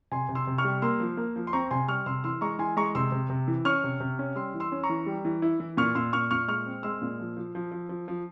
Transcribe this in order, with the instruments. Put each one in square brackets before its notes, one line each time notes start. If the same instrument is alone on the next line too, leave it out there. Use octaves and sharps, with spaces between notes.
[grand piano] C3 G#5 C6
C3
C6 E6
C3
C#6 F6
G3
A#3 C6 E6
F3
A#3
F3
C6
C4 A#5 C#6
C3 G#5 C6
G3 C#6 F6
C3 C6 E6
E3 C6 E6
G#3 A#5 C#6
E3 G#5 C6
G#3 A#5 C#6
C3 C6 E6
C3
C3
E3
C#4 C#6 F6
C3
C3
C#4
G3 C6 E6
E3
C6 E6
C#4
A#5 C#6
E3
G3
E3
E4
E3
A#2 C#6 F6
A#2 C6 E6
A#2 C#6 F6
A#2 C#6 F6
G#3 C#6 F6
C4
G#3 C6 E6
A#2
F3
F3
F3
F3
F3
F3